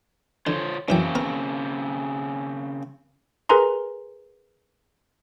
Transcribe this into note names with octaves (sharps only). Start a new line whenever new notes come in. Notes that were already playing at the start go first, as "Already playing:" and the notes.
D3 F4 C5 C#5
F#2 C#3 E3 A#3 C4 G5
B3 A#4
G#4 A#4 B4 G#5 A#5 C6